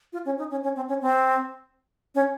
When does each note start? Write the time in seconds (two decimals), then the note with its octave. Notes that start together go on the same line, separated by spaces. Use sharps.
0.13 F4
0.25 C#4
0.38 D#4
0.51 C#4
0.63 C#4
0.76 C4
0.88 C#4
1.01 C4
2.15 C#4